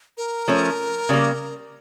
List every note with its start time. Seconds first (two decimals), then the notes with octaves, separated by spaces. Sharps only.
0.17 A#4
0.48 F3 A3 C#4
1.09 C#3 G3 A#3